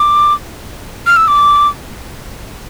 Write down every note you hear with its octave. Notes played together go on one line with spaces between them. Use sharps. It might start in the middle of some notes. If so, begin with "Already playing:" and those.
Already playing: D6
F6
E6
D6